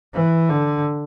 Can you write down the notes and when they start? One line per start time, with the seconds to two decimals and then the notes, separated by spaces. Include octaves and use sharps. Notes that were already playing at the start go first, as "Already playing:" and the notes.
0.14 E3
0.49 D3